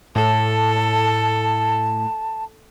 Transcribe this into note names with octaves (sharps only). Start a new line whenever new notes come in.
A2 A4 A5